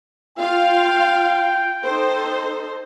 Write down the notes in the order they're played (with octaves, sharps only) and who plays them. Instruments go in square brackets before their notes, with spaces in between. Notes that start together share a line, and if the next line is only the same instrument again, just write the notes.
[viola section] F4 F5 [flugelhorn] G5
[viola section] D#4 A4 C5